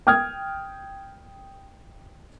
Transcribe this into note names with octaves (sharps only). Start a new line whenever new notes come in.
G5 D#6 F6 G#6